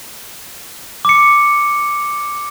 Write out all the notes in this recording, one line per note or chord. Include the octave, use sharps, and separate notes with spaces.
D6 C#7